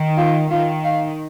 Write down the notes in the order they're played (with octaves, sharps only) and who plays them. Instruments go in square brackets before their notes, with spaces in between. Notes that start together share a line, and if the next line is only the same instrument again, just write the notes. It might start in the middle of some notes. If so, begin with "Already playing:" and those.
Already playing: [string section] D#3
[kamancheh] F4
[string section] D#3 [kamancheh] F4
[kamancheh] F5